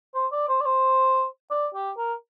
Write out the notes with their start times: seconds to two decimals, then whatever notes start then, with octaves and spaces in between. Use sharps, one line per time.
0.14 C5
0.32 D5
0.48 C5
0.60 D5
0.65 C5
1.51 D5
1.74 G4
1.97 A#4